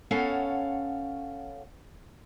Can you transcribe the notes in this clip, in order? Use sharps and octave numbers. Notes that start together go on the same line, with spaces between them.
B3 C#4 A4 C#5 F5 F#5